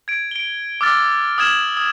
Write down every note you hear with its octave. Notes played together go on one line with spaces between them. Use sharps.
G#6 D7
D7 G7
D6 E6 F6 A6
D#6 F6 G#6 E7 F#7
D#6